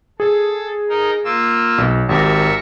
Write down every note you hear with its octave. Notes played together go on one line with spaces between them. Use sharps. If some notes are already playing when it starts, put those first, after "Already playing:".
G#4 A4
D#4 A#4
A#3 F4 E6
B1
G#1 G4 A#4 E5 C#6 A#6